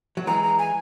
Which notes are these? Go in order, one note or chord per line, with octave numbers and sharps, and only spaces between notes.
F#3
E3 G#3 A#5
A#5
G#5